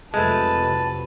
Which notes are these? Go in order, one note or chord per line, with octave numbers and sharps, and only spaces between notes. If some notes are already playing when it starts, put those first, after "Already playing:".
F2 C3 F#3 G#3 A3 B4 A5